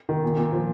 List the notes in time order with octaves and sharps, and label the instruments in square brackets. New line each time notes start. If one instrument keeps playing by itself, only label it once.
[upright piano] D#3
A#2
A#2
F3